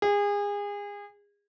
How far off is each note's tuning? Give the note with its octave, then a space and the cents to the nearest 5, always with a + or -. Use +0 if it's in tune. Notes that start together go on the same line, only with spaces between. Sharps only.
G#4 -30